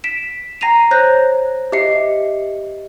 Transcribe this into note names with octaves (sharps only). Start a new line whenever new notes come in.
B6 D7 E7
G5 A#5 A#6 C7 D#7 F7
C5 C#5 A#5 F#6 G6 A#6
G4 D#5 E5 C7 C#7